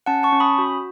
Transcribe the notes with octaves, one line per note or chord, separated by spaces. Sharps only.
C#4 F#5 A5
A5 C#6
C#4
B5 D#6
F#4